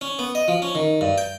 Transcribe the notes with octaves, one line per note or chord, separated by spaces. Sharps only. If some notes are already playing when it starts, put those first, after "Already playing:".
C#4
B3
D#5
F3
C#4
D#3
G2
G5